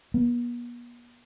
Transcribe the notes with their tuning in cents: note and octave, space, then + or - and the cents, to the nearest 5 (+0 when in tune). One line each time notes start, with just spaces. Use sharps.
B3 -45